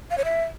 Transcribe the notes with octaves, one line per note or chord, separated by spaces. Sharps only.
F5
C#5
E5